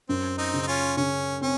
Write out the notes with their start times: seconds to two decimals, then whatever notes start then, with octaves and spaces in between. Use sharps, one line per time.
0.09 F#2 C4
0.38 C4 D#4
0.53 C#3
0.63 D#4
0.67 C#4 F4
0.97 C#3 C#4
1.41 C4 C#4